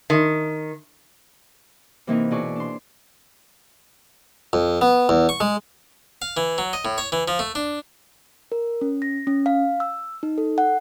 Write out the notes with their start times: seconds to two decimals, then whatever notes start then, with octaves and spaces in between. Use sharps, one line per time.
0.10 D#3
2.07 C3 E3 A#3 C4 D#4
2.31 B2 E4 G#4 D5 C#6
2.56 D4 C6
4.53 F2
4.81 B3
5.09 E2
5.29 C#6
5.40 G#3
6.22 F5
6.37 E3
6.58 F#3
6.73 D#5
6.85 A2
6.98 C#5
7.12 E3
7.28 F3
7.39 A3
7.55 D4
8.52 A#4
8.81 C#4
9.02 A#6
9.27 C#4
9.46 F5
9.80 E6
10.23 D#4
10.38 A4
10.58 F#5